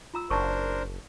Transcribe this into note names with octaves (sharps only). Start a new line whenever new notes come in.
F4 A#5 E6
F#1 D4 A#4 C5 A5 C#6